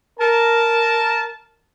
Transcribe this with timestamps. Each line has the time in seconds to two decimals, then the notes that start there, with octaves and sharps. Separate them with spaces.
0.20 A#4 A5